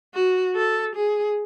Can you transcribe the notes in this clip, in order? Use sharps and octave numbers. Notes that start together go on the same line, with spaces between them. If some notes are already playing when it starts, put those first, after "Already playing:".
F#4
A4
G#4